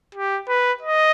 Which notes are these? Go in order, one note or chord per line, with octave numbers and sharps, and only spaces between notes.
G4
B4
D#5